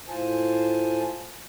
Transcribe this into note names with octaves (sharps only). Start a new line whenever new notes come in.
A2 F4 C5 G#5 A5